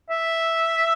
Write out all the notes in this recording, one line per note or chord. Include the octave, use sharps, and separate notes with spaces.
E5